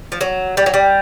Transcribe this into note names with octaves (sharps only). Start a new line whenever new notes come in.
F3
F#3
G3
F#3
G3